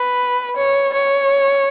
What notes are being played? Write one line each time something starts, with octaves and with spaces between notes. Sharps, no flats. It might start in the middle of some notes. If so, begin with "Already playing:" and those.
Already playing: B4
C#5
C#5